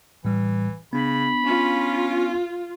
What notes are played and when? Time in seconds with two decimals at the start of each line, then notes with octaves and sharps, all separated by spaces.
0.25 A2 E3 G3
0.93 C#3 B3 D4 B5
1.46 C#4 F4